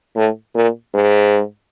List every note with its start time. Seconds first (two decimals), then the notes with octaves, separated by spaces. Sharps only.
0.16 A2
0.55 A#2
0.94 G#2